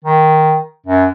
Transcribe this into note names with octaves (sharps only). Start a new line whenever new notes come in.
D#3
F#2